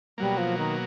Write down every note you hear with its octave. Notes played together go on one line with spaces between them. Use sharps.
B2 F#3 G3 A#3
F3
D#3